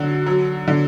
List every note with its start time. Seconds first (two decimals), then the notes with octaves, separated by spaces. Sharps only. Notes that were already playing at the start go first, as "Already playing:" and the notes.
Already playing: D3 F#3 F#4
0.26 F#3
0.68 D3